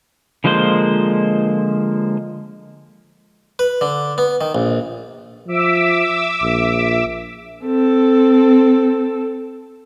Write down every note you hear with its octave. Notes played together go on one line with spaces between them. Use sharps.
D3 F3 G#3 A#3 C5
B4
D3
B3
D#3
A#1
F3 E5 D6 E6
A#1
C4 A4